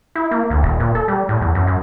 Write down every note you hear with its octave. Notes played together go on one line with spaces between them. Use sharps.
E4
A#3
D2
D#1
A#2
A4
G3
A2
E2
F#2
F#2